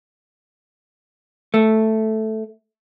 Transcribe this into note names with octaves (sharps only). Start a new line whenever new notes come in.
A3